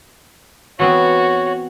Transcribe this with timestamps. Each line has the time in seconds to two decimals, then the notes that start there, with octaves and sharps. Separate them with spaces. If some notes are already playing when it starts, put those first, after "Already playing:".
0.79 E3 B3 C4 F#4 C#5